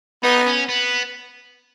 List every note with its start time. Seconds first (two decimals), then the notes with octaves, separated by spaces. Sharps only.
0.23 B3 D#4
0.46 C#4
0.69 B3